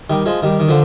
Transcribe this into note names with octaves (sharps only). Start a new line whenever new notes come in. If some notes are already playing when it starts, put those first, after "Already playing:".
D#3 G3
F3 G#3
D#3 G3
D#3
D3 F3